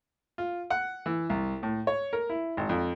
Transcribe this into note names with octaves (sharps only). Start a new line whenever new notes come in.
F4
F#5
E3
C2
A2
C#5
A#4
E4
G#1
F2